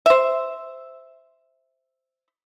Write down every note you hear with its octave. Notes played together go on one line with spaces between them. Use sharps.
C5 E5